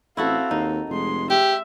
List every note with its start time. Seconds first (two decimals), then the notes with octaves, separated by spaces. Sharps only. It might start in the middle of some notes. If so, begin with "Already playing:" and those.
0.17 A1 C4 E4 F#4 A4 F5
0.51 D#2 D#4
0.89 F1 G#3 C6
1.30 G4 E5